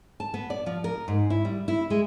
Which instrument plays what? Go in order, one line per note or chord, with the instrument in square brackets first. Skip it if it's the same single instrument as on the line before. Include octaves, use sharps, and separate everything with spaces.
[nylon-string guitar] A5
B3
D5
F3
A#4
G#2
E4
G3
E4
G#3